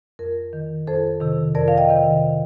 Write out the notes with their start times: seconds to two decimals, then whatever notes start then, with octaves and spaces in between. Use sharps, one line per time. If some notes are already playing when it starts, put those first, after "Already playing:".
0.19 F2 A#4
0.53 D#3
0.87 F2 A4 C5
1.21 C3 D#3
1.55 F2 A#4 D5
1.68 F5
1.77 D#5 G5
1.89 C3 D#3